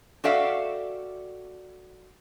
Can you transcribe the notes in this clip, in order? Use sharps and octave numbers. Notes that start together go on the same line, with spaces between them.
F#4 G4 A4 D5 E5 F5